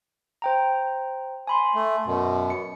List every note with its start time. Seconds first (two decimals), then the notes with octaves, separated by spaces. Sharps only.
0.42 C5 G5 A#5
1.47 G#5 B5 C6
1.75 A3
2.06 F#2 B2
2.50 C#7